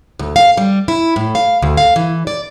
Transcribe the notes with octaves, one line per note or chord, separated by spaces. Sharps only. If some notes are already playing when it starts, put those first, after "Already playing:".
D2
F5
G3
E4
A2
F5
D2
F5
E3
D5